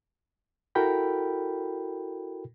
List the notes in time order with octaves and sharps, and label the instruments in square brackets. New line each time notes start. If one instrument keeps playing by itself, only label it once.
[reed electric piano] E4 F#4 A4 A#4 G5 B5